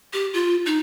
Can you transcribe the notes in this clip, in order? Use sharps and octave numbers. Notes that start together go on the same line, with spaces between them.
G4
F4
D#4